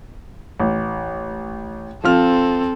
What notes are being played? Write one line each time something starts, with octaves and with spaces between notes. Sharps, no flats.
A1
F3 C4 F4 A4 F6